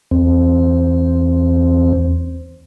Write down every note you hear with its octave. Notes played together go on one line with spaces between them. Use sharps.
E2 C4